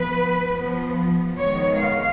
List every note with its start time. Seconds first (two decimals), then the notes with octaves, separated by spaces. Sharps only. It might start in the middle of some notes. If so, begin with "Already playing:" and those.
Already playing: F3 B3 B4
0.53 F3 B3
1.39 D#3 G#3 B3 C#5
1.82 F5